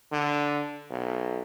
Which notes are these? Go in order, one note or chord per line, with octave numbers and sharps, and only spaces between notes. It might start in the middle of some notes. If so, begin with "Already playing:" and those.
D3
B1